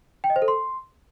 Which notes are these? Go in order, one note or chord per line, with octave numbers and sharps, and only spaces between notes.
G5
D#5
C5
A4
C6